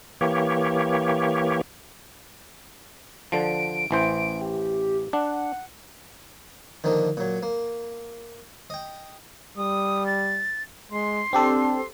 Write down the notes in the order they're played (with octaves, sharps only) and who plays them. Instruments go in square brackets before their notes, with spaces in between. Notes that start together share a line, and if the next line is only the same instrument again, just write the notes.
[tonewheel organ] E3 A#3 G4 C#5
[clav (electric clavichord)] D3 F3 [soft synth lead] D7
[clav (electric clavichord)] A1 E3 C5
[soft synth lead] G4
[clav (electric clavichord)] D4 [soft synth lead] F#5
[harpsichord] D3 D#3 F3 A#3 D#4
A#2 F#3
A#3
D#5 G5
[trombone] G3 [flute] D#6
[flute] A6
[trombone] G#3 [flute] C6
[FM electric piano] C4 G4 A4 [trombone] D4